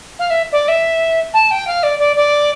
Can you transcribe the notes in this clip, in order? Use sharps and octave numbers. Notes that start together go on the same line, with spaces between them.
F5
E5
D5
E5
A5
G5
F5
D5
D5
D5